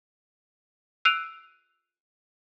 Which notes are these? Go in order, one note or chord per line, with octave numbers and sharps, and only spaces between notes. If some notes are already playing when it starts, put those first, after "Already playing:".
E6 F#6 C7 D7 D#7 F7